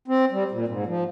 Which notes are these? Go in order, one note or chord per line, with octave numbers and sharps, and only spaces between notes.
C4
G3
A#2
G#2
F3